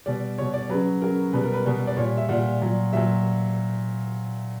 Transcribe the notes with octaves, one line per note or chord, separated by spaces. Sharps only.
B2 G3 D5
B2 G3 C#5
D5
C#3 F#3 B4
C#3 F#3 A#4
B2 G3 B4
A#4
B4
B2 G3
D5
A#2 G3 C#5
E5
A#2 G3 F#5
A#2 F#3
A#2 F#3 E5